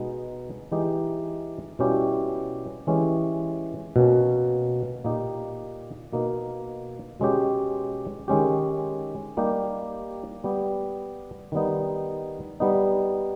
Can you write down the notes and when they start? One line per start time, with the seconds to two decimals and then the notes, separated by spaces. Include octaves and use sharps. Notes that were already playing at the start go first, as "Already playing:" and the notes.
Already playing: B2 G#3 B3 D#4
0.72 E3 G#3 D#4 G4
1.79 B2 G3 C#4 E4 G4
2.87 E3 G#3 C#4 G4
3.96 B2 A#3 C#4
5.04 A#2 A#3 D#4 G4
6.13 B2 A#3 D#4
7.20 B2 G#3 C#4 G4
8.28 D#3 G#3 C#4 G4
9.37 G3 A#3 D#4 G4
10.44 G3 B3 G4
11.52 D#3 G3 B3 D#4
12.60 G3 B3 D#4